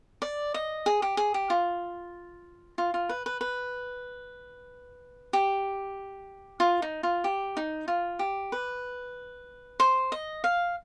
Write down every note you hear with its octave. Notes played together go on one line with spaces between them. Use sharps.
D5
D#5
G#4
G4
G#4
G4
F4
F4
F4
B4
B4
B4
G4
F4
D#4
F4
G4
D#4
F4
G4
B4
C5
D#5
F5